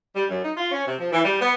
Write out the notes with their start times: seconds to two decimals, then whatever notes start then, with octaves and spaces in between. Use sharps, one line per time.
0.16 G3
0.29 F#2
0.43 D#4
0.56 F4
0.71 C#4
0.86 C3
1.00 F3
1.12 E3
1.25 G3
1.41 B3